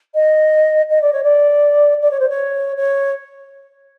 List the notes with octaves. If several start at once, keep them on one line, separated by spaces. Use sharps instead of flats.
D#5
D#5
D5
C#5
D5
D5
C#5
C5
C#5
C#5